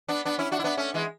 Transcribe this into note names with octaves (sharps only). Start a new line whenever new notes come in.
B3 D4
B3 D4
C#4 E4
D4 F#4
E4
B3 D4
A3 C#4
E3 G#3